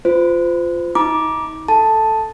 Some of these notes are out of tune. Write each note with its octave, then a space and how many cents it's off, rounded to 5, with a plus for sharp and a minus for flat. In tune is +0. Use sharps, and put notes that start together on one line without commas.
F4 +0 C5 -35
D#4 +40 A#5 +30 D6 +0
A4 +0 A5 +0